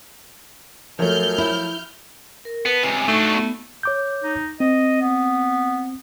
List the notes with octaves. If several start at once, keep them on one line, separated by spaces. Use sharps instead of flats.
F#2 F3 F#3 A3 F6 G6
E4
A#4
B3 B4 A5
C#2 C3 G#5 E6
F#3 A3 D4 D#4 A5 C#6
B3
C#5 D6 G6
D#4
C4 D#5
B3